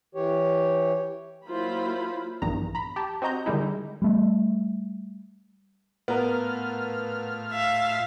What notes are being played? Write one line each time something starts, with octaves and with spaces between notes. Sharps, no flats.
E3 G4 C#5
F#3 A#3 E4 F4 C5 B5
A#1 E2 G2 D#3 A#5
A#5 B5
G4 A5
C4 F#4 D#5 A#5 G6
D3 D#3 G3 G#3 D#4 E4
G3 A3
A2 B3 F4 A#4 F6
E5 F5